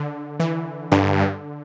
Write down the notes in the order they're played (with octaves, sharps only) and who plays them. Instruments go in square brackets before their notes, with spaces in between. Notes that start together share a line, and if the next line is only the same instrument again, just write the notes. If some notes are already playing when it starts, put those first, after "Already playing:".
Already playing: [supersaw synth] D3
E3
[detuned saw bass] G2 [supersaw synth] D3